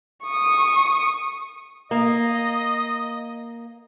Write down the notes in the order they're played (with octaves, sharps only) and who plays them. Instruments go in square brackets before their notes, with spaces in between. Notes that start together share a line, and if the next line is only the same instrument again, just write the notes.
[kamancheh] C#6 D#6
[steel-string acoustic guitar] A#3 [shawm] D#5